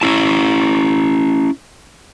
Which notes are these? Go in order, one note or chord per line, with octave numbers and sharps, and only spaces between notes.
C#4 E4 A5